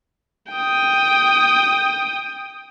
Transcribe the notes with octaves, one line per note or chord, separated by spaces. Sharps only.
G5 D#6